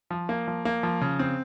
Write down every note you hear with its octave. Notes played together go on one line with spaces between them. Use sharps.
F3
A#3
F3
A#3
F3
C#3
C4